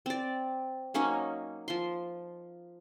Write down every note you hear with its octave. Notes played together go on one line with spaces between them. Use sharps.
C4 D5
F#3 A#3 C#4 D#4
F3 C6